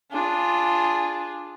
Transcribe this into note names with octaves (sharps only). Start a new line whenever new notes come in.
D4 F4 G#4